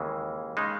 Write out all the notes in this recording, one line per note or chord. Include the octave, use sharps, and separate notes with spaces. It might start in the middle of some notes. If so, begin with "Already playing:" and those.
Already playing: D#2 C#3 E3 G#3
C#3 G#3 D#4